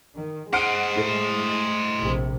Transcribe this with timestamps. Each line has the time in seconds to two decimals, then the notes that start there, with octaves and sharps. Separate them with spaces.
0.16 D#3
0.53 G#3 C5 D#5 F#5 F6 D7
0.96 A2 A3
1.97 A#1 C3